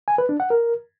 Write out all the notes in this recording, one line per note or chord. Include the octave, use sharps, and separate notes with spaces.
G#5
B4
D4
F#5
A#4